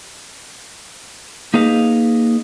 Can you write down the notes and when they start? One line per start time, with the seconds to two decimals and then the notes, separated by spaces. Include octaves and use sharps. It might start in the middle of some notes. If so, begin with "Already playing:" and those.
1.54 A#3 D#4 G#4 B4 D#5 F5